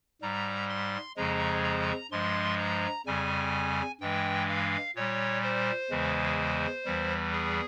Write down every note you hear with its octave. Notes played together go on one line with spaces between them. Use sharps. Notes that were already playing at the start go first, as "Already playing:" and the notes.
G#2 G3 A#5
C6
F2 C#3 F3 G#3 A#5
A#5
G2 F3 G#3 C6
A#5
F2 C#3 G3 G#5
G2 E3 G#3 G5
F5
A#2 G3 C#5
C5
E2 C#3 E3 G#3
E2 E3 G3
G#4